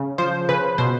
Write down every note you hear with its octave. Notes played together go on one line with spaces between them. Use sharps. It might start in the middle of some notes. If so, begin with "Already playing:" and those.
Already playing: C#3
F3 C5
C#3 B4
B2 C5